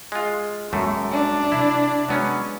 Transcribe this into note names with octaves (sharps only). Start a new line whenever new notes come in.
G#3 F4
D#1 F#2 G#3 A3
D4
C3 E4
F#3 G#3 B3 C#4